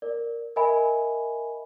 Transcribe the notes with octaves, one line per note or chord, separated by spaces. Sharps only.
A#4 D5
A#4 D#5 E5 G#5 B5